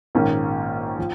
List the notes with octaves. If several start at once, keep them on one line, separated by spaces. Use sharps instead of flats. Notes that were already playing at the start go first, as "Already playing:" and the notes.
A#1 G#2 D#3 A#3 C#4
F3